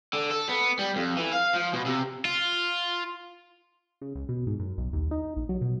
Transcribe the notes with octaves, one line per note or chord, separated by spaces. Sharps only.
D3
A4
B3
G3
F2
E3
F5
F3
B2
C3
F4
C#3
C#2
B2
G#2
F#2
B1
D#2
D#4
A#1
F#3
B2